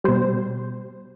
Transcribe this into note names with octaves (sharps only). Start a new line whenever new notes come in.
B2 G3 C5